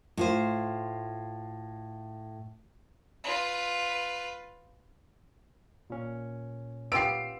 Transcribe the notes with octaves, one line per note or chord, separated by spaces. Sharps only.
A2 F4 C5
F4 B4
A#2 C#4
B3 F4 G4 E6 C7 D7